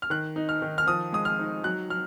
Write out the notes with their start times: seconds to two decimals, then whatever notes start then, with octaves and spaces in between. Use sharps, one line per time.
0.02 F6
0.10 D#3 F#6
0.36 D#4
0.49 F6
0.62 D#3
0.78 F6
0.87 F3 D#6
1.12 G#3 D#6
1.25 F6
1.39 D#4
1.64 F#3 F#6
1.90 F#3 F6